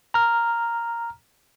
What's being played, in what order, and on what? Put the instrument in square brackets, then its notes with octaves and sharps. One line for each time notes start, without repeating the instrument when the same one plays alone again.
[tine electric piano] A#5 F6